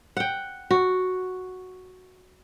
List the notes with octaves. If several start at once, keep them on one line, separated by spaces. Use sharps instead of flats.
F#5 G5
F#4